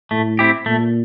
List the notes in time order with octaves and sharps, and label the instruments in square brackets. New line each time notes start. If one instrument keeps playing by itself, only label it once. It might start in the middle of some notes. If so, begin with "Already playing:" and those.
[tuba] A2 [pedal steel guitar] A3
[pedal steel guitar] C4 E4 G4
[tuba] A#2 [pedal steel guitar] A3